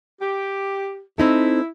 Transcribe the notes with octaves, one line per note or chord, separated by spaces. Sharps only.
G4
C4 D#4 E4 A4